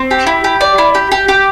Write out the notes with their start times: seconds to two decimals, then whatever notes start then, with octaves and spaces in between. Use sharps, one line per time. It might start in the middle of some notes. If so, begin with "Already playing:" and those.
Already playing: C4
0.11 G4
0.27 E4
0.44 G4
0.61 D5
0.78 E4
0.95 G4
1.12 G4
1.28 G4